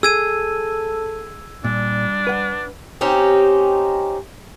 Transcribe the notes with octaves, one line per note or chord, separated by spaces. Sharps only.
G#4 A4 E6 G#6 D#7
A#2 G3 D4
B4 F#5
C4 C#4 D#4 G4